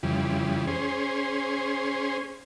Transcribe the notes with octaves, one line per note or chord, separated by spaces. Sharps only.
F2 C#3 E3 G3
C#4 G#4 C5